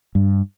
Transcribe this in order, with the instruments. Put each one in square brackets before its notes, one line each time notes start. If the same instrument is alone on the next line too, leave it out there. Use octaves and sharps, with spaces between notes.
[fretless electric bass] G2